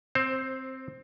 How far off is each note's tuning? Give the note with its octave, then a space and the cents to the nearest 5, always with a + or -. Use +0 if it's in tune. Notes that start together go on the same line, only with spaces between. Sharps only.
C4 +0 C5 +20